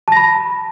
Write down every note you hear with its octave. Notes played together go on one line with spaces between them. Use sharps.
A5 B5 A#6